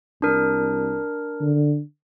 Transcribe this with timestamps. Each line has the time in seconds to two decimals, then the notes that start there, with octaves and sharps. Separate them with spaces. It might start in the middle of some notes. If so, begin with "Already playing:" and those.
0.22 C2 D4 A#4
1.41 D3